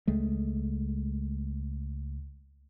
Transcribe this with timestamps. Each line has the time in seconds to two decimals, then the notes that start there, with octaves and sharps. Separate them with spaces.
0.07 C#2 G#3 A3